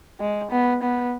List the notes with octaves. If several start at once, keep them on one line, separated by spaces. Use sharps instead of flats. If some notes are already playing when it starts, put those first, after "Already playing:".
G#3
B3
B3